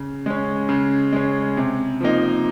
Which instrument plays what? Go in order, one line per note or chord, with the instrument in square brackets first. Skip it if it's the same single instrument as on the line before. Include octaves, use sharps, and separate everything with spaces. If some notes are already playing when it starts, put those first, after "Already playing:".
Already playing: [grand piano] C#3
G#3 C#4
C#3
G#3 C#4
C3
F3 A#3 D#4